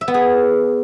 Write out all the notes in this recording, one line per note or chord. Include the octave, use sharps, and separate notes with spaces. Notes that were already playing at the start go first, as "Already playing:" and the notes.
E5
B3
G#4